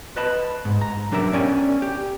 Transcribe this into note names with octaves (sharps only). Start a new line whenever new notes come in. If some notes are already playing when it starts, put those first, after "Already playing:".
B4 D#5 A5 B5
G#2
A#5
F#3 D4 G4 A#4 E5
B3 C#4 D5 G5 G#5
G4